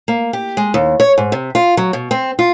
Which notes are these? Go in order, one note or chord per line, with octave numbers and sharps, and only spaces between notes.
A#3
G4
G#3
D#2
C#5
G#2
C3
F4
F#3
B2
C4
F4